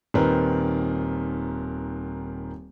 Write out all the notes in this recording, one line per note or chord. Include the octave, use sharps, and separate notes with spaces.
D#1 D#3 C4 A#4 B4